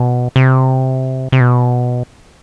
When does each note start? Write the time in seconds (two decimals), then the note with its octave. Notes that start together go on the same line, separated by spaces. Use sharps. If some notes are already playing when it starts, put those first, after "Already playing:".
Already playing: B2
0.36 C3
1.32 C3
1.40 B2